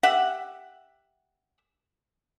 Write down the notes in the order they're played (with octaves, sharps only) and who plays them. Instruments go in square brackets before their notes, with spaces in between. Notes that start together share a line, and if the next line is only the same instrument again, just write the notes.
[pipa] G4 E5 F#5